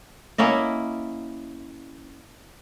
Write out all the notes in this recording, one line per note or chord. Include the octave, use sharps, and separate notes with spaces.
A#3 C#4 E4 D#5